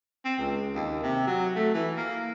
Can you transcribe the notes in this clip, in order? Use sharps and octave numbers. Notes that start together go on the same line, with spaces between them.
C4
C#2
D#2
C3
F#3
A3
E3
A#3